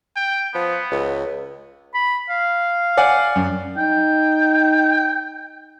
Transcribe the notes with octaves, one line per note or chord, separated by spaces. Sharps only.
G5
F3 B3
C#2
B5
F5
D5 F#5 G#5
F#2
D#4 G5